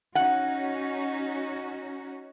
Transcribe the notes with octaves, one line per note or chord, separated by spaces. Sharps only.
C#4 D#4 F#4 F#5